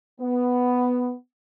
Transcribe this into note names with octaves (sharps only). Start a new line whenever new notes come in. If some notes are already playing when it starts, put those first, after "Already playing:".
B3